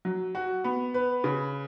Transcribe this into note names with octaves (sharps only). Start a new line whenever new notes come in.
F#3
F#4
B3
B4
C#3